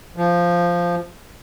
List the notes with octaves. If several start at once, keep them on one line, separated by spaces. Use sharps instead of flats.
F3